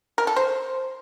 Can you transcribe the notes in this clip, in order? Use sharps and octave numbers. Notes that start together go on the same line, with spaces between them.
A#4
A4
C5